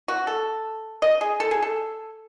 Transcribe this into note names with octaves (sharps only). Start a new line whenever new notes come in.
F#4
A4
D#5
G#4
A4
G#4
A4